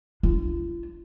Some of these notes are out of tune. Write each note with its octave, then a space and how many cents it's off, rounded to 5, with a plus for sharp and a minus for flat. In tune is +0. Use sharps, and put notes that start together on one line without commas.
D4 +5 F4 -40